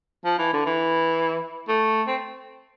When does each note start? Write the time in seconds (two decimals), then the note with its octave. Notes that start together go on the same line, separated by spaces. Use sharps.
0.25 F3
0.39 E3
0.53 D3
0.66 E3
1.68 A3
2.07 C4